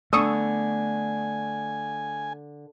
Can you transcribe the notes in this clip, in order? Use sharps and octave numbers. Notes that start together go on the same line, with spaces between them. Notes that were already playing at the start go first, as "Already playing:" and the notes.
D3 A3 B3 G#5 C#6 D#6 E6